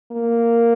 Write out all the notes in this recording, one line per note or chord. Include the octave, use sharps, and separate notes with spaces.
A#3